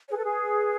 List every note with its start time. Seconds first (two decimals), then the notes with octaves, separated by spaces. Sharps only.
0.08 G#4 C#5
0.12 A4 B4
0.23 G#4